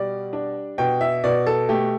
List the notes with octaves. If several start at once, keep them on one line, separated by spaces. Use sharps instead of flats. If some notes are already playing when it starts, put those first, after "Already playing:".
Already playing: B2 G3 D5
D4
B2 G5
E5
B2 D5
A4
A3 G4